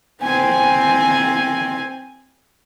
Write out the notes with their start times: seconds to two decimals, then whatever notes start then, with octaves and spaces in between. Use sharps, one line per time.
0.23 C4 G#5